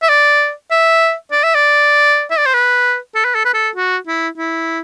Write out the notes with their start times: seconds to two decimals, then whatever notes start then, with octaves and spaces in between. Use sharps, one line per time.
0.02 E5
0.09 D5
0.71 E5
1.32 D5
1.44 E5
1.55 D5
2.31 E5
2.38 D5
2.46 C5
2.54 B4
3.15 A4
3.25 B4
3.35 A4
3.45 B4
3.54 A4
3.76 F#4
4.07 E4
4.38 E4